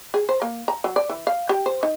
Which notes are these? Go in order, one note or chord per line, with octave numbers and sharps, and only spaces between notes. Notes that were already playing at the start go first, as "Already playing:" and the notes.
G#4
C5
A#3
A#5
F#3
D5
E3
F5
G4
C5
D#4